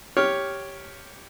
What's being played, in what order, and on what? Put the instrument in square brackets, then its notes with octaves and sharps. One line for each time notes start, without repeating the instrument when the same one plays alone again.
[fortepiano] G4 C#5 F6